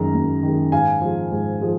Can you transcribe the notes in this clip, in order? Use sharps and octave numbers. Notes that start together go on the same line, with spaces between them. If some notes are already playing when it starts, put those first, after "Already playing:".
Already playing: F#2 D#3 G#3 A#5
F#2
D#3 G#3
G#2 F5 G#5
F3 G#3
G#2
F3 G#3